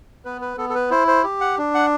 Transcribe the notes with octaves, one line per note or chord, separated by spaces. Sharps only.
B3 B4
B4
B3 A4
A4
B4
E4 C5
C5
G4
F#5
D4
F#5